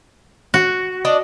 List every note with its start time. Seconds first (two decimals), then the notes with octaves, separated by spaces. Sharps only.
0.54 F#4
1.05 D4 D5 D#5